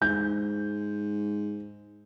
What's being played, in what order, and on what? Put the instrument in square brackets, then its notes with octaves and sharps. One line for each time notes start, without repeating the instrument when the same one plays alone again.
[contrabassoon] G#2 [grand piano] G6